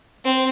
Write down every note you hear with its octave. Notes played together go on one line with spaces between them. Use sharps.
C4